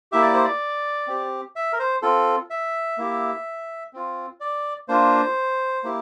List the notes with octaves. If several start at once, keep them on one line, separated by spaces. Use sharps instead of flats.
A#3 E4 G4 E5
D5
C5
D5
C4 G4
E5
A#4
C5
C4 F4 A4
E5
A#3 E4 G4
C4 F4
D5
A#3 D4 F4 C5
A#3 E4 G4